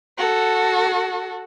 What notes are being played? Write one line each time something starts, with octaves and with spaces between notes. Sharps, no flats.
F#4 A4